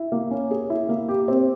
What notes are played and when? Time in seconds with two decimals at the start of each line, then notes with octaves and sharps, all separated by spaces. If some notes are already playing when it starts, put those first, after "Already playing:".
Already playing: E4
0.12 A#3
0.31 C#4
0.51 G#4
0.70 E4
0.89 A#3
1.09 G4
1.28 C4